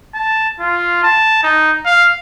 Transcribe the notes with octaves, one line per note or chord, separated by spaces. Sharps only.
A5
F4
A5
D#4
F5